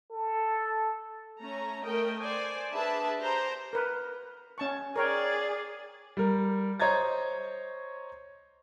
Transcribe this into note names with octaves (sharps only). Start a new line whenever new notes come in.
A4
A3 C#4 A#5
A3 A#4 D#5 G5
C5 D5 G#5
D4 G#4 B4 E5 A5 B5
G4 C5 A#5
A#4 B4
C#4 A5 C#6
G#4 A#4 C#5 D5 G5
G3 A#4
C5 C#5 D#5 A#5 G#6 A6